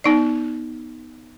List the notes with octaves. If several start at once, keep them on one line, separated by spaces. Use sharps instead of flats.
B3 D#4 D5